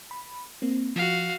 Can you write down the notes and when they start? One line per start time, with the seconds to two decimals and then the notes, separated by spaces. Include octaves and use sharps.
0.11 B5
0.62 A#3 C4
0.96 F3 F#4 F5